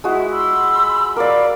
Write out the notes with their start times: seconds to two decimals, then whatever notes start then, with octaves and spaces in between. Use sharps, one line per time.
0.04 G#3 E4 F#4
0.32 B5 C6 E6
1.16 A#4 D5 F5 B5 D6